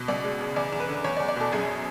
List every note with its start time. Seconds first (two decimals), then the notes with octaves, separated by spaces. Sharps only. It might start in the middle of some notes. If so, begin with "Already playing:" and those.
Already playing: B2
0.08 C#2 D5
0.24 G#3
0.40 C#3
0.56 E2 D5
0.72 E2
0.80 B4
0.88 D3
1.04 E2 C#5
1.17 D5
1.20 E2
1.28 D5
1.36 B2 A4
1.52 F#2 G#4